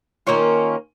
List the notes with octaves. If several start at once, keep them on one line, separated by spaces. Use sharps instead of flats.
D#3 A#3 C#4 F4